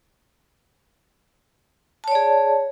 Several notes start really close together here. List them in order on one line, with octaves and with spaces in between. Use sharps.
A5 C#5 D5 G#4